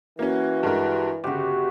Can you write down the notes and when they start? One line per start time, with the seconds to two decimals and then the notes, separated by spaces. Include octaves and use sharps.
0.19 E3 A#3 C#4 F#4
0.63 G2 G#3 A#4
1.24 G1 C#3 F#4 G4